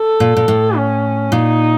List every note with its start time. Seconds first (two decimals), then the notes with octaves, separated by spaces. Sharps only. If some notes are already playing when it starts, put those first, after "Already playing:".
Already playing: A4
0.20 A#2
0.37 A#2
0.48 A2
0.76 C#4
1.32 A#2 D#4